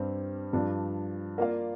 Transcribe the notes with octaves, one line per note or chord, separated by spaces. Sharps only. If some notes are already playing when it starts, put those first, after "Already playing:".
Already playing: G2 G3 C4
G2 F3 D4
A#3 F4 D5 F5